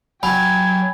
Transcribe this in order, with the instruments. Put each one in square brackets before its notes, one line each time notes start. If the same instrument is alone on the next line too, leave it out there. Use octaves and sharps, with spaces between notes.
[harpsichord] F#3 [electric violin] G5 G#6 [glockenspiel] G#5 B5